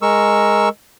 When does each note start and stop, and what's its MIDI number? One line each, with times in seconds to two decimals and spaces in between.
0.02 0.69 56
0.02 0.69 70
0.02 0.69 85
0.02 0.69 88